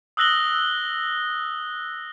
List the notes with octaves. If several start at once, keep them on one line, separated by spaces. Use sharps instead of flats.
D#6 E6 F#6 A#6 F#7 G7